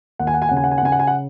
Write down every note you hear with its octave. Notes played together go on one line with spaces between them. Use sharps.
D#2 F#5
G#5
F#5
G#5
C#3 F#5
G#5
F#5
G#5
F#5
C#3 G#5
F#5
G#5
F#5